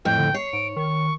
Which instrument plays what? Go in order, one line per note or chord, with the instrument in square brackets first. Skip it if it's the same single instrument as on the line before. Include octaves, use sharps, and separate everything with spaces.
[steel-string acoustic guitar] F2 A2 [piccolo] G5
[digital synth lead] D3
[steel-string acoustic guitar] C#5 [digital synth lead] C7
[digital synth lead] G#2 [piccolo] D7
[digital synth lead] D#3 [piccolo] C#6